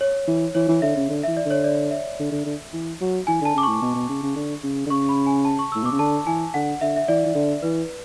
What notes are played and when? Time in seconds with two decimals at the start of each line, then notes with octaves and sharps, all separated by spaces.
0.01 C#5
0.27 E3
0.55 E3 C#5
0.68 E3
0.82 D3 E5
0.96 C#3
1.09 D3
1.23 E3 E5
1.37 D5
1.45 D3
1.50 C#5
1.64 D5
1.91 E5
2.19 D3
2.32 D3
2.45 D3
2.73 E3
3.01 F#3
3.27 E3 G#5
3.41 D3 A5
3.55 C#3 D6
3.63 A2 C#6
3.82 B2
3.95 B2
4.09 C#3
4.23 C#3
4.36 D3
4.63 C#3
4.86 D3
4.90 C#3 C#6
5.09 B5
5.27 G#5
5.45 A5
5.59 C#6
5.72 A2 E6
5.84 B2 D6
5.92 C#3
5.99 D3 A5
6.26 E3 G#5
6.54 D3 F#5
6.81 D3 E5
6.96 E5
7.08 E3 D5
7.26 E3
7.35 D3
7.62 E3 B4